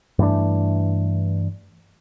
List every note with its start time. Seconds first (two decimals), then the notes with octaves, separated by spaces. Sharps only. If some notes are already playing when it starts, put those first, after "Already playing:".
0.19 G2 E3 A3 D4